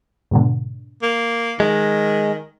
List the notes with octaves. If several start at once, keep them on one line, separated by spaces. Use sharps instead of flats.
G#2 B2 D3
A#3
D#3 G#3